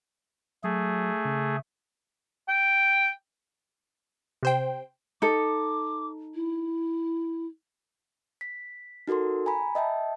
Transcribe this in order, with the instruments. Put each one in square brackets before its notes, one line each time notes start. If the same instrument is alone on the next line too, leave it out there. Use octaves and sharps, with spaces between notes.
[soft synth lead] F#3 [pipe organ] A3 G#4
[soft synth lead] C#3
[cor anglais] G5
[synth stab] C3 C5 G5
[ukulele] D#4 A4 [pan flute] D6
[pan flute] E4
[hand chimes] B6
D#4 F#4 A4 A#4 C6
G#5 A#5 B5
D#5 E5 G5 A5